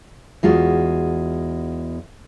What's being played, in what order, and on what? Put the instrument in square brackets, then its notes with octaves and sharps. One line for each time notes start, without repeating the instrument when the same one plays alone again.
[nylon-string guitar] E2 G#3 F4 F#4